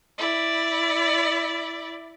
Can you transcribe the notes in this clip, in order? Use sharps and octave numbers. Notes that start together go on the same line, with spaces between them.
E4 D5